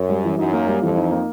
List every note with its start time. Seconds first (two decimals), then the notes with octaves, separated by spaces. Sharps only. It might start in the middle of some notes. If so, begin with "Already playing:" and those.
Already playing: F#2
0.09 G3
0.24 E3
0.38 F#2 D#4
0.53 A#3
0.67 G3
0.82 F2 E3
0.97 D#4
1.11 A#3